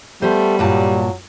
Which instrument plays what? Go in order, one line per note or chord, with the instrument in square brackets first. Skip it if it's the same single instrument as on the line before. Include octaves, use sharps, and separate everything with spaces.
[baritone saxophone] G3 [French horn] A3 [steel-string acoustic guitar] B3 C5
[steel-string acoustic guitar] G2 A#2 A5 [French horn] F#3